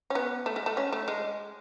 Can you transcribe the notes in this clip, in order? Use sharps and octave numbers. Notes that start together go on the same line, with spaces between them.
C#4
B3
A3
G#3
A3
C#4
A3
G#3